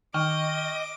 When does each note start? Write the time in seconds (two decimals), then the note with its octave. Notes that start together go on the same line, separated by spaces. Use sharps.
0.14 D#3 D#5 G5 C#6 D6 F6